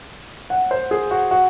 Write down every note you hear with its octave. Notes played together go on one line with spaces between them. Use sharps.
F#5
C5
G#4
F#4
F#4